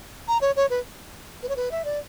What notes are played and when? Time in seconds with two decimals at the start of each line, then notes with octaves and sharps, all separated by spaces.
0.28 A#5
0.41 C#5
0.56 C#5
0.70 B4
1.43 B4
1.49 C#5
1.56 B4
1.71 E5
1.85 D5